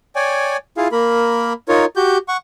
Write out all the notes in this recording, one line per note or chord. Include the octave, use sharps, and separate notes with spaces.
C#5 D5 G5 G#5
E4 F4 G#4 F5
A#3 A#4 B5
D#4 F4 A#4 C#5
F#4 G4 G6
F#5 C#6